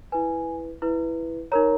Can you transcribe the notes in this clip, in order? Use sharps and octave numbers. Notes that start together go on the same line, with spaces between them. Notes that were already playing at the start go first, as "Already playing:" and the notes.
E4 B4 G#5
E4 B4
D#4 A#4 C#5 A#5